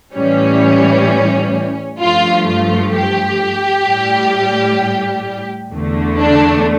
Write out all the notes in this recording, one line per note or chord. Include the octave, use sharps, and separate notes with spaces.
A2 E3 G3 C#4
G2 F3 A3 F4
F4
G4
A2 G3
E2 D3 A3
D4